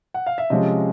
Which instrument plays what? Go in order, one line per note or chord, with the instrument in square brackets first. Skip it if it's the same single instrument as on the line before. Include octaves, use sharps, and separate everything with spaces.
[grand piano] F#5
F5
E5
C3 F3 G#3 C#4 D#5